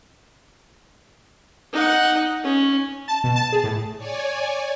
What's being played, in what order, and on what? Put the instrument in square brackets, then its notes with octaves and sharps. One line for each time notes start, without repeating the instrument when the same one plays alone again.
[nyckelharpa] D#4 F#5
C#4
[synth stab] A5
B2
A5
G#4
A2
[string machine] C#5 D5 G#5